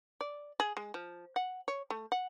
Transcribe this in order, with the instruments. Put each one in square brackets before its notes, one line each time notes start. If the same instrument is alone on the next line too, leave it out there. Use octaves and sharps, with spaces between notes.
[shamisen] D5
G#4
G#3
F3
F#5
C#5
A3
F#5